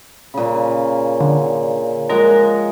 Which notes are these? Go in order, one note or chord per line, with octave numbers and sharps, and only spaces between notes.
A#2 C#3
D3
F3 G#3 A#4 F#5